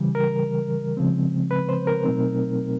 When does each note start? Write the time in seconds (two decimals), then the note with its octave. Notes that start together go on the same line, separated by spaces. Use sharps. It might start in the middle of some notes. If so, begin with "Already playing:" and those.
Already playing: C#3 E3 G3
0.15 A#4
0.97 C#3 F3 G#3 C4
1.51 B4
1.69 C5
1.87 A#4
2.04 B2 F#3 A3 C4 D#4